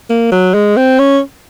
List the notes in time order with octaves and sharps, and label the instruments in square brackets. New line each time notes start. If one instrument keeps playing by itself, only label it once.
[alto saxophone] A#3
F#3
G#3
C4
C#4